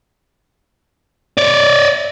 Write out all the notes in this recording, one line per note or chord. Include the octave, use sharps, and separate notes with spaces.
C#5 D5